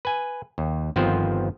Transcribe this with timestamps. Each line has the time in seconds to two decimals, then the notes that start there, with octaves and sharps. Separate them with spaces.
0.05 B4 G#5
0.58 D#2
0.96 G1 D#3 F3 B3 C4 C5